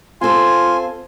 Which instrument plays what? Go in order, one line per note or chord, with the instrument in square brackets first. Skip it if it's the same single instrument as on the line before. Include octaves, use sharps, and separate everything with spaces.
[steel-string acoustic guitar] C4 A4 [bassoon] F4 [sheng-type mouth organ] G#5 C6